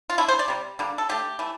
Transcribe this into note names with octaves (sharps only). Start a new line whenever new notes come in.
F4
D3 A3 E4
C5
D5
C3 G3
D3 G3 A#3
A4
D3 A3 G4
E3 A3